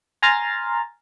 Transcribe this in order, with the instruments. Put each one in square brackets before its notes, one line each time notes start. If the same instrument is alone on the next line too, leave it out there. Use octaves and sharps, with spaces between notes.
[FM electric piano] G#5 A#5 C6 F6 A6